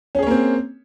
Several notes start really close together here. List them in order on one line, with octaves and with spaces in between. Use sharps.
C#4 G#4 C#5 A#3 C4